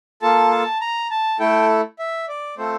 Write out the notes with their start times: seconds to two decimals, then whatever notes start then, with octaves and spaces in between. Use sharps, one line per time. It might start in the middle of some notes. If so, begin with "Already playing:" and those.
0.22 A#3 F4 A4 A5
0.51 A5
0.81 A#5
1.11 A5
1.40 A3 E4 A4 G5
1.99 E5
2.28 D5
2.58 A3 C4 F4 A4 C5